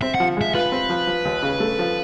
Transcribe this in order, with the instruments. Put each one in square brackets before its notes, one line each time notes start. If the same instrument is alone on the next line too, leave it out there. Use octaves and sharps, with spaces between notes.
[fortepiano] C4 [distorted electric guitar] E5
[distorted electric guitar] F#5
[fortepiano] F3
[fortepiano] G#3 [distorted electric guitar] E5
[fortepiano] F4 [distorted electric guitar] B4
[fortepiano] C4
F3
F3
D#2
C#3
A3
F3